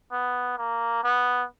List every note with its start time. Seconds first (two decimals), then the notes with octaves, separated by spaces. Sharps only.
0.12 B3
0.57 A#3
1.03 B3